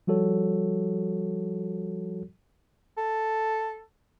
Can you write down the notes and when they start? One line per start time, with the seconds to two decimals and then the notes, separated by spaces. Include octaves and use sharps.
0.07 F3 G3 F#4 A4 C#5
2.97 A4